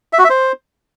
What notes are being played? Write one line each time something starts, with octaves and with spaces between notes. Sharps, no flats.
E5
F#4
E5
C5